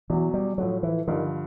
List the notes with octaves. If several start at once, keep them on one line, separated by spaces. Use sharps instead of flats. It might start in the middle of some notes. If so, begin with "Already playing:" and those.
E2 B2 E3 F#3
G3
A2 F3 F#3 A3
E3
G2 D3 D#3 F3